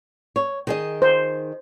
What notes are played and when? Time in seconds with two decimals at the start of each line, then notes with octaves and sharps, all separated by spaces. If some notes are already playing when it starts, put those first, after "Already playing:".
0.36 C#5
0.67 D#3 G#4 D#5
1.02 C5